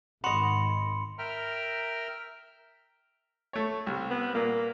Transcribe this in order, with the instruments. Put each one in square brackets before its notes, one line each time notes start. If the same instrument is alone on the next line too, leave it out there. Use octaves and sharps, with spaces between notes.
[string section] G#1 D#3 [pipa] F#4 D#5 [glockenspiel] B5 C6 C#7
[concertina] A#4 E5 G5 A#5 F6
[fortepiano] A3 C#5
C2 C3
[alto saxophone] B3
[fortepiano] A#2 [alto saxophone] A#3